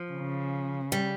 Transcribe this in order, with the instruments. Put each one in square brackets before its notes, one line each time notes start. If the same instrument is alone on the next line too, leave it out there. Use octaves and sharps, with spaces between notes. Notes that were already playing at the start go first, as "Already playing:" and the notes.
Already playing: [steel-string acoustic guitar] F3
[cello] C#3
[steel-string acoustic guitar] G3